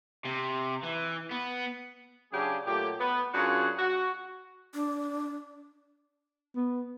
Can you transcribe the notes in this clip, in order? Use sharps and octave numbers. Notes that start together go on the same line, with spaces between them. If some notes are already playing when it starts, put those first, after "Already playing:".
C3
E3
B3
C#3 F#3 D4 G4 G#4
A#2 F#3 A3 G4
B3
F#2 D4 F4 F#4 G#4 C#5
F#4
D4
B3